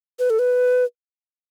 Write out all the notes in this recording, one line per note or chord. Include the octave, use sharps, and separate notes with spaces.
B4
A4
B4